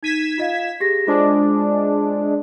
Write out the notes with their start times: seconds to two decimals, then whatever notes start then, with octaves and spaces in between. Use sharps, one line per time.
0.03 D#4 G#6 B6 D#7 E7
0.38 F4 D#5 F5
0.80 G4 G#4 A#6
1.07 G#3 D4 F4 C5 D6